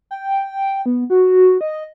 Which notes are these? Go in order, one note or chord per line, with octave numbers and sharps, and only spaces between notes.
G5
B3
F#4
D#5